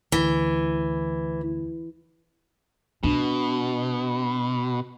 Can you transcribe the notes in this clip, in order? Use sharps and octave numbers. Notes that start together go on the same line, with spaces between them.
D2 E3
B2 D4